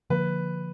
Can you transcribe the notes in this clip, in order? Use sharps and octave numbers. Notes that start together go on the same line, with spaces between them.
D3 F3 A#3 B4